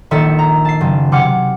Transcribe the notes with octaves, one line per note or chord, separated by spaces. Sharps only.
A#1 D#3 A4 E5 E6 C#7
A#5
A5 C7
F#1
C3 F#5 D6 F6 C#7